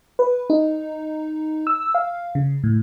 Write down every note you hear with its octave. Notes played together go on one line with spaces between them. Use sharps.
B4
D#4
E6
F5
C#3
A2